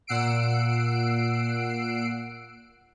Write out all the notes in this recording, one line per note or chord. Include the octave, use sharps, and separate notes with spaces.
A#2 F#5 E6 C7 D7